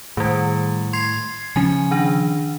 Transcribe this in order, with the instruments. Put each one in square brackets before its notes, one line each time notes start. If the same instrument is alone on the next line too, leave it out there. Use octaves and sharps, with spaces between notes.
[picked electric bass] A2 [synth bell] D#3 G3
[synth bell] C6 G#6 C7
[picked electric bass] C#3 F3 C#4 [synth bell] G#5
[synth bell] D#3 D4